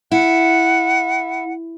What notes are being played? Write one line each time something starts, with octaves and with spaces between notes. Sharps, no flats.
E4 F#5